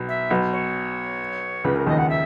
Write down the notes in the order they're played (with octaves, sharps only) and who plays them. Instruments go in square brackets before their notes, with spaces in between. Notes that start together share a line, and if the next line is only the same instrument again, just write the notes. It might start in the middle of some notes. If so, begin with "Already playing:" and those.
Already playing: [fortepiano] B1 B2
[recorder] E5
[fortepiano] B1 B2
[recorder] C#5
[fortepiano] C#2 C#3 [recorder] B4
[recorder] A#4
[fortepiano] D#2 D#3 [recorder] D#5
[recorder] F#5
E5